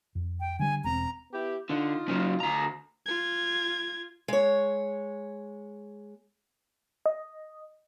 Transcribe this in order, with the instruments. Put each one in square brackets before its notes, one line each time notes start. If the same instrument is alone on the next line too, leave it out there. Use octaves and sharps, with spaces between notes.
[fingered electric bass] F2
[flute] G5
[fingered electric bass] D3 G3 [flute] G#5
[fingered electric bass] E1 C4 [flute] A#5
[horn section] B3 E4 G4
[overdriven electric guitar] D3 [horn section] D#4 F4
[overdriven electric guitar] C#3 F#3
D2 A#5
[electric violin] F4 G#6
[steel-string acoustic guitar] G#3 C#5
[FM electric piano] D#5